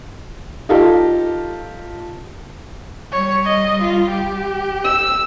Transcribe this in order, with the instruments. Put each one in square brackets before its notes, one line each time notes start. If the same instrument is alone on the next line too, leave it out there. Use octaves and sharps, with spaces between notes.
[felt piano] D#4 F4 G4 A4
[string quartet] G3 [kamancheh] C#5
[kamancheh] D#5
F4
G4
[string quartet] E6